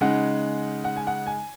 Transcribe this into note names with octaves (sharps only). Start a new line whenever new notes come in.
C#3 G#3 D#4 F#5
F#5
G#5
F#5
G#5